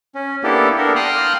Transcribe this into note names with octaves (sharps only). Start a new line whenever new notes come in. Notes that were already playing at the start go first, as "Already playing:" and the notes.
C#4
A#3 B3 D4 E4 G4 A4
B3 D4 A4 A#4
F5 G5 C6 D#6 F6 F#6